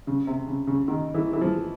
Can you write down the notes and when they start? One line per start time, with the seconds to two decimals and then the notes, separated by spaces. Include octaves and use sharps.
0.07 C#3
0.27 C3
0.47 C#3
0.67 C#3
0.88 D#3
1.14 E3
1.33 E3
1.41 F3